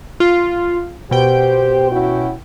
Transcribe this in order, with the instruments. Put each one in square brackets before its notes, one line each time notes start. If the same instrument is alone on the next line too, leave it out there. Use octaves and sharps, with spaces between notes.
[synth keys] F4
[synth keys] B2 G5 [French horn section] G4 C5
[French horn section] C#4 E4 F#4